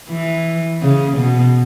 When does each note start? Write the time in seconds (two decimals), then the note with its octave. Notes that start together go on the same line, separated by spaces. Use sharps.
0.10 E3
0.82 C#3
1.17 B2